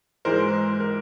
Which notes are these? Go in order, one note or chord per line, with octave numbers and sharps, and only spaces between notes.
G#2 E3 G#3 A#4 C5
A#4